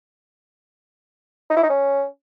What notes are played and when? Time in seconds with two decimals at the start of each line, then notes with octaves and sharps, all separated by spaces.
1.50 D#4
1.56 E4
1.63 D#4
1.70 C#4